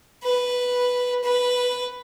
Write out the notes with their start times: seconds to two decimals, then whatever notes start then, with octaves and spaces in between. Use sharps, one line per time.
0.23 B4
1.24 B4